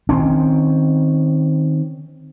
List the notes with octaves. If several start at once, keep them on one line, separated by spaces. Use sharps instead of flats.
D#3 C4 C#4